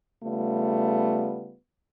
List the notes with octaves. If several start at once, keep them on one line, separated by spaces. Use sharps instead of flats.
C#3 G3 A3 B3 F4